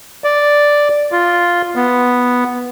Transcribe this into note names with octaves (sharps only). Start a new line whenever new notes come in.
D5
F4
B3